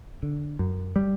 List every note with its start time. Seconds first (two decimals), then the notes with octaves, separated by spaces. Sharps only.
0.23 D3
0.59 F#2
0.96 G3